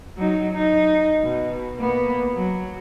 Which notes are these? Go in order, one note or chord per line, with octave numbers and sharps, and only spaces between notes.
F#3 D#4
D#4
B2
A#3 B3
F#3